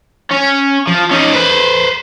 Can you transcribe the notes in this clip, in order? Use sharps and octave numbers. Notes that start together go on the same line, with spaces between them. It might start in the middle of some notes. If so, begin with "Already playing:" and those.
C#4
F3
C#4 D#4
B4 C5